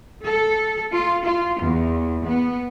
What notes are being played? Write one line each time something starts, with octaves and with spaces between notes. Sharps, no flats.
A4
F4
F4
E2
B3